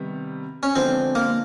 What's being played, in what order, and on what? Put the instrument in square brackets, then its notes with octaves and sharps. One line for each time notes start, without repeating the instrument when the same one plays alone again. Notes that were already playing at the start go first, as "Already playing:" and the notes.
Already playing: [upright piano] C3 D#3 G3 B3
[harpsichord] C#4
[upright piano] D3 F3 G#3 B3 D4 [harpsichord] C4
[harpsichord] A#3